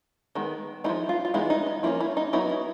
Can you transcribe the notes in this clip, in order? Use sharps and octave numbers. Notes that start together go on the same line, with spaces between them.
D#3 G#3 B3
F3 G#3 B3 D#4 E4
F4
F4
E3 G#3 B3 D#4 E4
D#4
E4
F3 A#3 C#4 E4
E4
D#4
F#3 B3 D#4 E4
E4